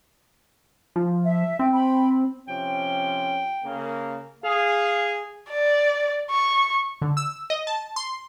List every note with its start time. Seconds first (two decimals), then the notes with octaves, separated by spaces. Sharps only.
0.96 F3
1.25 E5
1.59 C4 G5
1.73 G5 B5
2.48 C3 F3 C#4 G5
3.64 C#3 A#3
4.44 G#4 F5
5.49 D5
6.30 C#6
7.02 D3
7.17 E6
7.50 D#5
7.67 A5
7.96 C6